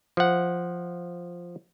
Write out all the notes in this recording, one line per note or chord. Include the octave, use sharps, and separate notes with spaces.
F3 F#5